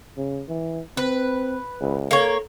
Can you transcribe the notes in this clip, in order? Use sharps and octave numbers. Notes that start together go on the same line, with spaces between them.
C#3
E3
C4 B4
C#2
A#3 A4 C#5